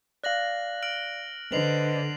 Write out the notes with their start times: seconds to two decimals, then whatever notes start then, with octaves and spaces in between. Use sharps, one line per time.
0.24 D5 F5 F#6 A#6 F#7
0.83 F6 D7 F#7
1.52 D3 B4 C5 D#5 C7 F7 F#7